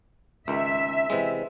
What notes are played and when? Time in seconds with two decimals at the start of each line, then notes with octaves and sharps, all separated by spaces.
0.48 C#2 D#3 E5
1.10 C3 E3 G#3